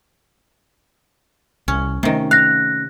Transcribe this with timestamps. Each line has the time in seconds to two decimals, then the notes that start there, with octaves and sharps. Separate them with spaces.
1.68 C2 C#4
2.03 C3 D#3 A3 A#3 C#4
2.31 F5 F#6 A#6